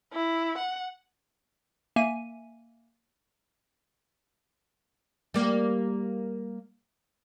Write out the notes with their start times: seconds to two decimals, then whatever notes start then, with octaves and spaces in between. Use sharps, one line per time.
0.13 E4
0.58 F#5
1.96 A#3 E5 G#5 D#7
5.34 G3 A#3